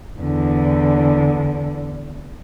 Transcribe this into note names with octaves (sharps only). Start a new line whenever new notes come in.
E2 D3